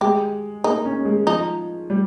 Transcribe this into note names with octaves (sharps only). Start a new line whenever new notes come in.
G#3 G4
A#3 D#4
C#4
G#3
F3 D#4
G3